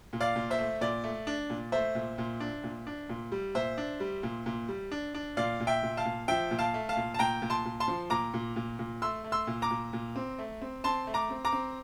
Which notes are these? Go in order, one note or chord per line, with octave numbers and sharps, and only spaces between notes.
A#2
D5 F5
A#2
C5 E5
A3
A#2 D5
A3
D4
A#2
A3 C5 E5
A#2
A#2
D4
A#2
D4
A#2
G3
A#2 C5 E5
D4
G3
A#2
A#2
G3
D4
D4
A#2 D5 F5
A#2
E5 G5
A#2
F5 A5
A#2
F3 E5 G5
A#2
F5 A5
A3
F5 A5
A#2
A5
A#2 G5 A#5
A#2
A5 C6
A#2
A5 C6
F3
A#2 A#5 D6
A#2
A#2
A#2
A3 C6 E6
A3
C6 E6
A#2
A#5 D6
A#2
A#2
C4
A3
C4
C4 A5 C6
A3
A#5 D6
C4
A#5 D6
C4